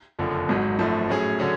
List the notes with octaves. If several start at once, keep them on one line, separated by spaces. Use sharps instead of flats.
F#1 F2 D3 F3
G#1 G#2 F#3
G#1 F#2 F3 A3
A2 F#3 C#4 G#4
D3 F#3 C#4 G#4